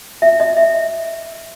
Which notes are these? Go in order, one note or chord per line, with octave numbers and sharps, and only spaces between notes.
E5
D#5
E5